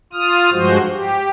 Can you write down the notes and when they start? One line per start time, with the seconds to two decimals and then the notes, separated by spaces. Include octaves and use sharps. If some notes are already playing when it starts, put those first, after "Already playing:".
0.13 F4 D#6 F6
0.52 G2 F3 G#3 F#4 C5
0.91 G4